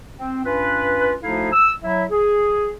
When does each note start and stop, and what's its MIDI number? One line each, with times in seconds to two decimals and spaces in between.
0.17 0.44 60
0.44 1.13 43
0.44 1.13 61
0.44 1.13 65
0.44 1.13 71
1.22 1.52 38
1.22 1.52 53
1.22 1.52 63
1.22 1.52 64
1.22 1.52 69
1.22 1.52 77
1.52 1.71 88
1.83 2.03 54
1.83 2.03 64
1.83 2.03 76
2.11 2.71 68